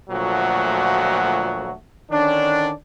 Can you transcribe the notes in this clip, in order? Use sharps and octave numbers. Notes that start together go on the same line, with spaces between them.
D2 A#2 F3 F#3 A3 F#4
D3 D#3 C#4 D4